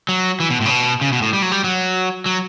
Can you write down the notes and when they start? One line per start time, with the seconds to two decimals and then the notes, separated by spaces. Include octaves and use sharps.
0.09 F#3
0.40 E3
0.50 B2
0.61 A2
0.66 C#3
0.71 B2
1.01 C#3
1.12 B2
1.22 A2
1.33 G3
1.42 F#3
1.52 G3
1.64 F#3
2.26 F#3